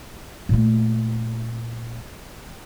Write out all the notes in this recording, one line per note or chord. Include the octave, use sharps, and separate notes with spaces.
A#2 A3